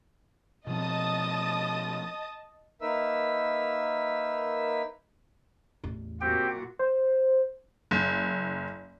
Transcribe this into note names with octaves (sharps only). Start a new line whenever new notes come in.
B2 F3 C4 D#5 A5 D#6
A#3 D#4 A#4 B4 E5 E6
A1 E2
A#2 C4 F#4 G4 G5
C5
F#1